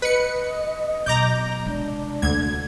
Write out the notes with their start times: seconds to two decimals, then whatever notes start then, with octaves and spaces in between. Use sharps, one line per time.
0.02 B4 D#5 C#7
1.06 B2 F#3 A#5 D6 G6
1.66 C3 G#3 D4
2.22 D2 G#6